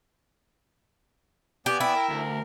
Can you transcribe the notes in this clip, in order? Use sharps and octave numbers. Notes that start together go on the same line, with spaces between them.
B3 G4 D5 G#5
E4 G5
A#4
D2